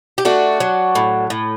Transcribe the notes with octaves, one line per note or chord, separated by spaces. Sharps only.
G4
A3 D4 F#4
F#3
A2
A2